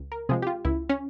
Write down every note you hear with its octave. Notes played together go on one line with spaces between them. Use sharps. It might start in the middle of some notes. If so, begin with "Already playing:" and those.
Already playing: C#2
A#4
C3 F3 G#3 G#4
G4
F4
C#2 E4
C#4